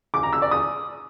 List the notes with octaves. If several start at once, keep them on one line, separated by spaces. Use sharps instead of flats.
D6
A#5
E6
D5
D#6